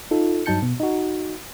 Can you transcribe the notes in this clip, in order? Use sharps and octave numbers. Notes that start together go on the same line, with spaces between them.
D#4 F4 A4
G2 F#3 D#4 A5 G6 C#7
B2
D#4 F#4